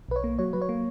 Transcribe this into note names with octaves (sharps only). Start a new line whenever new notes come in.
B1 B4
C#5
A#3
F#3 C#5
F#3 B4
C#5
A#3